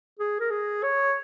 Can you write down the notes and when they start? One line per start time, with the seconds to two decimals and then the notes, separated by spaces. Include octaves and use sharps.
0.19 G#4
0.40 A#4
0.51 G#4
0.83 C#5